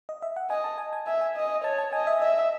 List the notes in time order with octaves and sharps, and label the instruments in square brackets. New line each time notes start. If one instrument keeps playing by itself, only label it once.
[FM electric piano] D#5
E5
F#5
[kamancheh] D#5 [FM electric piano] G#5
[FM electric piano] A5
G#5
G#5
[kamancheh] E5 [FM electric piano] G#5
[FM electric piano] G#5
[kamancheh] D#5
[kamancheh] C#5 [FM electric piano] A5
[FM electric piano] A5
[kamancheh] D#5 [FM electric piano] G#5
[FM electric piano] E5
[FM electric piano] D#5 [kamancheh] E5